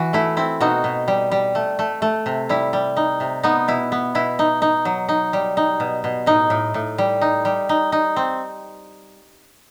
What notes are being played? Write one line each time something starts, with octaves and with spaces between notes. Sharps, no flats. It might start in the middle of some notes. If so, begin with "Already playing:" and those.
Already playing: E3 F#4
A3 E4
C4 E4
B2 D#4 F#4
B2
G3
G3
A3
A3
A3
C3
G3 E4
G3
D#4
C3
B3 D#4
B2 E4
B3
B2 E4
D#4
D#4
F#3
D#4
G3
D#4
B2
B2
A2 D#4
A2
A2
G3
D#4
G3
D#4
D#4
C4